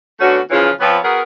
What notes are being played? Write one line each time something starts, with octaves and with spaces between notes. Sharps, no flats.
D3 A3 B3 C#4 F#4
C#3 E3 F3 C#4 F4
F3 B3 C4 F4 B4 C#5
B3 F#4 G#4 A#4